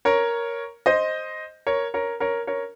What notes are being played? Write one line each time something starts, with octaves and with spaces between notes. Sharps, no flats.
A#4 C#5
C5 D#5
A#4 C#5
A#4 C#5
A#4 C#5
A#4 C#5